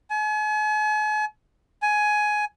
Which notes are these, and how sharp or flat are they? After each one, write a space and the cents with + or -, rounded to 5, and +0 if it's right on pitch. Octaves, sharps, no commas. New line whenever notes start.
G#5 +40
G#5 +15